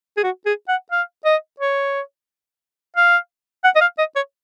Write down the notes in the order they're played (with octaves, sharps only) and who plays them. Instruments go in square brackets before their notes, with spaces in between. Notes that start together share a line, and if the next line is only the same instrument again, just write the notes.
[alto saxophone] G#4
F#4
G#4
F#5
F5
D#5
C#5
F5
F#5
D#5
F5
D#5
C#5